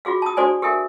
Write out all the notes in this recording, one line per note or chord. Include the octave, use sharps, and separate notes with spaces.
F4 F#4 G#4 F5
A5 D#6
D4 F#4 A4 C5 D5 G#5
G4 A4 A#4 E5 G#5